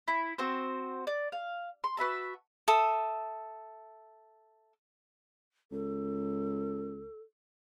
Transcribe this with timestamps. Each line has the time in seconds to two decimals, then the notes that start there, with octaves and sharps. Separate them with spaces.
0.08 E4
0.38 C4 F#4 C5
1.07 D5
1.32 F5
1.84 C6
1.97 F#4 B4 E5 A5
2.68 A4 E5 D#6
5.72 C#2 A4